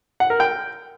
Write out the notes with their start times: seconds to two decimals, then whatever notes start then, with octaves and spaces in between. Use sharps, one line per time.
0.20 F#5
0.30 A#4
0.40 G5